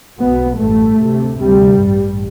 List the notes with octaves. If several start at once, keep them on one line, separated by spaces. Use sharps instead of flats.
B1 B2 B3
A1 G2 A3
D2 C3
D2 C3 G3
A1 G2